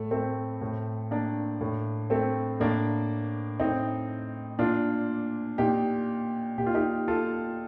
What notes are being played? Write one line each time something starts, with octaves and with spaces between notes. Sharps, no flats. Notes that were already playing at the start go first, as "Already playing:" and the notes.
Already playing: A2 A3
A3 C4
A2
A#3 D4
A2
A3 C4
A2 A#3 D4
A2 C4 D#4
A#2 D4 F4
A#2 D#4 G4
A#2 G4
F4
D#4 G4
F4 A4